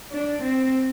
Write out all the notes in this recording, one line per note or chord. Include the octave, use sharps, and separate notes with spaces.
D4
C4